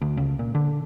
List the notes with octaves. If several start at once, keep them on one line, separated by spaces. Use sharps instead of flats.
D2
C#2
A#2
D3